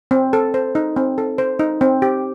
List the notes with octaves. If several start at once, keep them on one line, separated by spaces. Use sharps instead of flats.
C4
A4
C5
D#4
C4
A4
C5
D#4
C4
G4